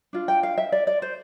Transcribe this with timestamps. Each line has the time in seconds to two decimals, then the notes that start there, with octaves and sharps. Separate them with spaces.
0.13 D4 F4
0.28 G5
0.43 F5
0.58 E5
0.72 D5
0.87 D5
1.02 C5